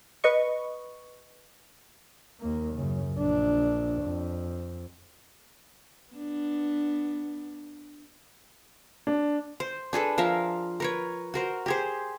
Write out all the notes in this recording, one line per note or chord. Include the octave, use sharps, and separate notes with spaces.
B4 D#5 C#6
D#2 A#3
F#2 C#3
A#1 D4
F2
B3 D4
D4
C5
D4 G#4 A4 B4
F3 A#4 E5 F5
A#4 B4 C#5
F#4 A#4 C5
G4 G#4 C5